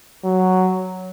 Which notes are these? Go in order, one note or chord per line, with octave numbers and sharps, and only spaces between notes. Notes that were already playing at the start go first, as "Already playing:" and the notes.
F#3